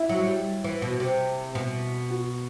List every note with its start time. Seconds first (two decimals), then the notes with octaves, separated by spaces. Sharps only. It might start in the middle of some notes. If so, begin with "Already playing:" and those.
Already playing: E4
0.09 F#3
0.27 G3
0.64 E3
0.82 B2
1.00 C3
1.55 B2
2.11 F#4